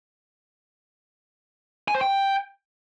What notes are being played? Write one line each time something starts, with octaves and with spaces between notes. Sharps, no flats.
G#5
C5
G5